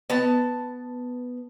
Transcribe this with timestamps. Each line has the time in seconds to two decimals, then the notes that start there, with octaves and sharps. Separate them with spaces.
0.10 B3 A5